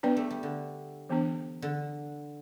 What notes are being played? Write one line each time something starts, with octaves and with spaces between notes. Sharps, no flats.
G3 B3 D4 B4 D5
A3
G3
D3
E3 B3 D4
D3